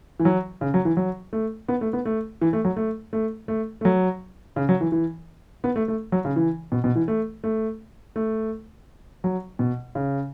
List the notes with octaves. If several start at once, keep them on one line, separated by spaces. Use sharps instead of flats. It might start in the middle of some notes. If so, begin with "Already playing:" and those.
E3
F#3
C#3
F#3
E3
F#3
A3
B3
A3
B3
A3
E3
A3
F#3
A3
A3
A3
A3
F#3
C#3
F#3
E3
E3
B3
A3
A3
F#3
C#3
E3
B2
B2
E3
A3
A3
A3
F#3
B2
C#3